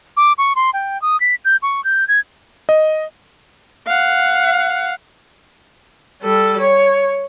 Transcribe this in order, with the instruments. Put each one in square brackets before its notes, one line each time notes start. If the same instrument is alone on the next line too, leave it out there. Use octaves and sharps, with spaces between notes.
[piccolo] D6
C#6
C6
G5
D#6
B6
G6
C#6
G6
G#6
[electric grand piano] D#5
[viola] F5 F#5
G3 A4
C#5